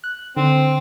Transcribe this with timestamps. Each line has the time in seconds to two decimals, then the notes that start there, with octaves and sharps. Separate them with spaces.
0.04 F#6
0.37 D3 C4